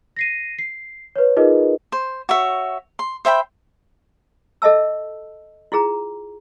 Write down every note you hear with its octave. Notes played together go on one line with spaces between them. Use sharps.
A#6 C7 D#7
C7
B4 C#5
D#4 F4 G#4 A#4 B4 D#5
C5
F#4 C#5 E5
C6
C5 E5 G5 B5
A4 D#5 E5 A5 E6
E4 F4 G#4 A#5